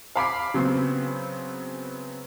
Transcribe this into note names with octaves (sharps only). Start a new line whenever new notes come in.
F5 B5 D6 C7
C#3 F#3 B3 C4